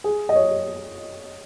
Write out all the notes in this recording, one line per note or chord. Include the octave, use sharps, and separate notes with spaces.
G#4
D#5
C#5